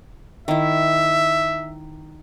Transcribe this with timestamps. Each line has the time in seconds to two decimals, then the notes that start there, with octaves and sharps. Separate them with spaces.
0.48 D#3 E4 E5